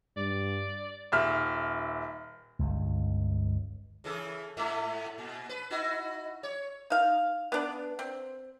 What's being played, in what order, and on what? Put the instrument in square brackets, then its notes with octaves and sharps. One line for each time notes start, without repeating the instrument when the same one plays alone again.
[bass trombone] G2 [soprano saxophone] D5
[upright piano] D#1 E5 F6
[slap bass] G1 C#2
[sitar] C#3 E3 A4
G#2 A3 E5
A#2
B4
D#4 E4 F#4
C#5
[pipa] D#4 F5
B3 D4
C4